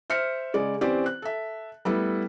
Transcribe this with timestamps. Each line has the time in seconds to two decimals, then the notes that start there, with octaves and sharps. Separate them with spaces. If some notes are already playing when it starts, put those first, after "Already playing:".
0.10 C5 E5 F6 C#7
0.54 C#3 G#3 D5
0.81 E3 C4 C#4 G4 C5 D5
1.06 F#6
1.22 A4 E5
1.85 G3 A3 B3 E4